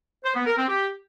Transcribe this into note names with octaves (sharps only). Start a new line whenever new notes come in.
C5
B3
A#4
C4
G4